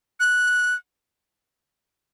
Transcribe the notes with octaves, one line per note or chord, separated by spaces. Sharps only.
F#6